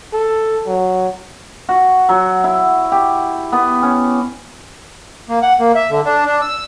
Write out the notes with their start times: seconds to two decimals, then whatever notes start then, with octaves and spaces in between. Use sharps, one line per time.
0.13 A4
0.66 F#3
1.69 F#4
2.09 F#3
2.44 E4
2.92 G4
3.52 B3
3.83 C#4
5.29 A#3
5.42 F#5
5.60 A#3
5.75 E5
5.90 D3
6.05 D4
6.26 D4
6.41 E6